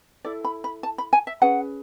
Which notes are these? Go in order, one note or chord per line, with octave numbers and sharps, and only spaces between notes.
E4 A4 D5
B5
B5
A5
B5
G#5
E5
C#4 G#4 B4 F#5